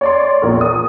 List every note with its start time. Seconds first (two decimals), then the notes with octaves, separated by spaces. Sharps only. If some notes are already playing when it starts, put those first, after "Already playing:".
0.01 C#5 D5 C6
0.42 A#1 E2 A#4 C#6
0.61 D#6